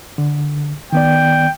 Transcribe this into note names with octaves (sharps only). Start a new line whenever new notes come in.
D3
D#3 B3 D5 G5